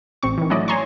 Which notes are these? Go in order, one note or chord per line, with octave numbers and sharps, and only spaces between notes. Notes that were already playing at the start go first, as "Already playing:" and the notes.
A1 C4 C#6
D#3 E3
F#3 A3 C#4 E4 D5 D#5
C#5 G#5 A#5 C6 C#6